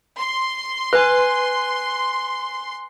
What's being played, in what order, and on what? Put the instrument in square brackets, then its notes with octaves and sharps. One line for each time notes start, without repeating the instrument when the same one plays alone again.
[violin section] C6
[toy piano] B4 [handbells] G#5 F#6